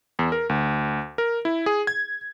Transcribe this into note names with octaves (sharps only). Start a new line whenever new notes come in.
E2
A#4
D2
A#4
E4
G#4
G#6